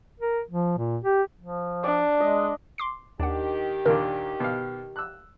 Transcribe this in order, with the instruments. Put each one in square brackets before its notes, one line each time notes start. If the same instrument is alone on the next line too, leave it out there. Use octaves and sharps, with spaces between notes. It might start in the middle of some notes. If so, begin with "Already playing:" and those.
[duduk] A#4
F3
A#2
G4
F3
[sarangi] D4 [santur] D5
[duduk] G#3 [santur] D#5
[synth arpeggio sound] C6 D6 C7
[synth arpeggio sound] D#2 F#5 [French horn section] D#3 G4 [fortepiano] D4
[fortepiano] D#2 A#2 D4 [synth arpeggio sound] A#4
[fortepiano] B2 F5
E6 F#6